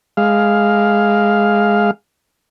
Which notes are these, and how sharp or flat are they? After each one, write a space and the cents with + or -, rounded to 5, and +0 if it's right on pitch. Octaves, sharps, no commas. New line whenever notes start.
G#3 +0 F5 +0